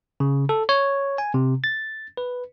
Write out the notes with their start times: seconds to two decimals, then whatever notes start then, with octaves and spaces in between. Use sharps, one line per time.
0.20 C#3
0.49 A4
0.69 C#5
1.18 G#5
1.34 C3
1.64 A6
2.17 B4